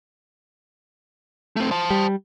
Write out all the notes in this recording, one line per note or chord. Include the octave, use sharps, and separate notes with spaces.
A3 C4
C5 A5
G3